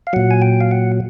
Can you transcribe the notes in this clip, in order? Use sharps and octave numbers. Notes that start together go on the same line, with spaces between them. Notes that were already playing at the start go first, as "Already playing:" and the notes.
F5
A#2 F#3 F#5
G#5
G5
F5
F#5